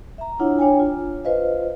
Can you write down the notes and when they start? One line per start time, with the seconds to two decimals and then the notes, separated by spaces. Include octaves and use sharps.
0.18 E5 A#5
0.39 D4 E4 F4 C#5 F#5
0.58 D4 C#5 G5 G#5
0.79 F4
1.24 F4 B4 C5 D#5 F5